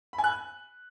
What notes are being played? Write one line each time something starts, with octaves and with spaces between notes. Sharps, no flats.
B5
G#5
F#6